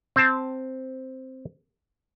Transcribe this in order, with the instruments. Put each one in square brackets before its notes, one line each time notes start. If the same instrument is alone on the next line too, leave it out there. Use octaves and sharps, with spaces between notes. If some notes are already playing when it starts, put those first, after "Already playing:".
[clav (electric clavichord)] C4 A5